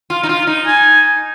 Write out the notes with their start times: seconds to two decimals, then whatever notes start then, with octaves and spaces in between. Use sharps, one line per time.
0.10 F4
0.23 D#4
0.29 F4
0.47 D#4
0.67 G#5